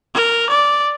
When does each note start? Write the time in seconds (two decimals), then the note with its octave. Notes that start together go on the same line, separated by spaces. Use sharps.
0.15 A#4
0.50 D5